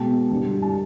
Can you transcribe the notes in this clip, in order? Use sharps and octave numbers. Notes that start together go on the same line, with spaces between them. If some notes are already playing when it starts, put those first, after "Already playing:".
Already playing: B2 G#3 B3 G5 A5
G2 D3 G3
A5